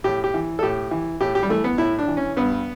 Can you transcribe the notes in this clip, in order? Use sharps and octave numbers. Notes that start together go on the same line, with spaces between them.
A2 G4
G4
E3
A4
A2 G4
E3
A2 G4
G4
G3
E3 A3
B3
A2 E4
D4
E3
C#4
G2 B3